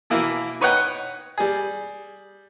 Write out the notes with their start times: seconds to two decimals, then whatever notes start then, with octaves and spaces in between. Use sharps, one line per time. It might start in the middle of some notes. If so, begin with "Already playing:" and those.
0.10 B2 E3 A#3 E4
0.61 D#4 B4 C#5 D#5 F#5 G5
1.38 G3 G#4